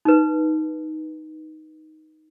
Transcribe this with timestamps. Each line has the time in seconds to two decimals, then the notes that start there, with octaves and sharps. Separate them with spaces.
0.05 D#4 B4